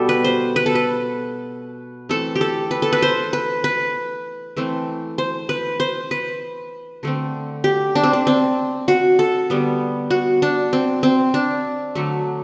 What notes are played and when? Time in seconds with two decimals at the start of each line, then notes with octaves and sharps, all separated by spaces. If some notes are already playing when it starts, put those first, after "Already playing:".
Already playing: B2 G3 B3 G4 A4
0.09 B4
0.24 C5
0.56 B4
0.66 A4
0.75 B4
2.09 E3 A3 C4 A4
2.36 G4
2.41 A4
2.71 B4
2.82 A4
2.92 B4
3.02 C5
3.33 B4
3.64 B4
4.57 E3 A3 C4
5.18 C5
5.49 B4
5.80 C5
6.11 B4
7.03 D3 A3 C4
7.64 G4
7.95 D4
8.03 C4
8.13 D4
8.27 C4
8.88 F#4
9.19 A4
9.50 D3 G3 B3
10.11 F#4
10.42 D4
10.73 C4
11.03 C4
11.34 D4
11.95 D3 F#3 A3